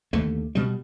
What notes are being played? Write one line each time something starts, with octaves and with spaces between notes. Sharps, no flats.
D#2 D3 A3
B2 G3